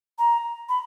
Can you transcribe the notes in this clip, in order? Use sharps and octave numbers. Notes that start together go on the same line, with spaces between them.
A#5
B5